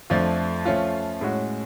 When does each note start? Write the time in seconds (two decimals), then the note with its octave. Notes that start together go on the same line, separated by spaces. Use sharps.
0.10 F2 F3 A3 D4 F4
0.65 F3 A3 C#4 F4
1.21 A2 G#3 C#4 F#4